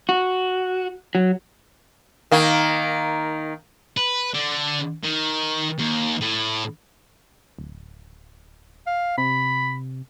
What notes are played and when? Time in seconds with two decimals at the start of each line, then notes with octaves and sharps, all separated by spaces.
0.09 F#4
1.15 F#3
2.32 D#3 A#3
3.97 B4
4.34 D3 D4
5.04 D#3
5.79 D#2
6.21 A2
7.59 D1
8.87 F5
9.18 C3 B5